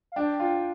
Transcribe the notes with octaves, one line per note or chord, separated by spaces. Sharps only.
F5
D4 G5
F4